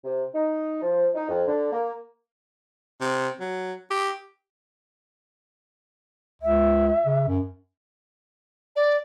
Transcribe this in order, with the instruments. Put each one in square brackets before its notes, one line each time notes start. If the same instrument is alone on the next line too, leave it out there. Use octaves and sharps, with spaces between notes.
[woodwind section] C3
D#4
F3
D#4
F2
D3
A#3
[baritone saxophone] C3
F#3
G4
[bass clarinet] C#2 [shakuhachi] E5
[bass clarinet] C#3
F#2
[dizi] D5